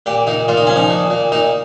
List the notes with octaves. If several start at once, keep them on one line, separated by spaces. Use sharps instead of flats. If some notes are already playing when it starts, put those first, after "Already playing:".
A#2 G4
A#2 D#4
A#2 F4
D#4
F3 C#4
D#4
A#2
A#2
A#2 D#4